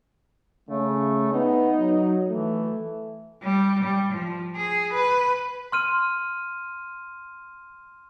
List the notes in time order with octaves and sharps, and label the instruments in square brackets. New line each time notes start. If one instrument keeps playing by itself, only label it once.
[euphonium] C#3 [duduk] A3
[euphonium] B3 [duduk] D#4
[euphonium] F#3
[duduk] E3 [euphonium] A3
[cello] G3
G3
F3
G#4
B4
[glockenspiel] C6 F6 D#7